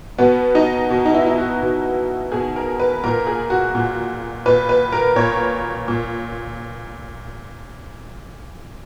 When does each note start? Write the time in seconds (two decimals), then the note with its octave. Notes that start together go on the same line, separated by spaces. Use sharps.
0.18 B2 B3
0.55 D#4
0.90 B2
1.05 D#4
1.14 E4
1.26 E4
1.38 F#4
1.62 B2
2.32 B2 G#4
2.56 A#4
2.80 B4
3.04 A#2 A#4
3.27 G#4
3.50 F#4
3.75 A#2
4.46 A#2 B4
4.69 B4
4.92 A#4
5.16 A#2 C#5
5.88 A#2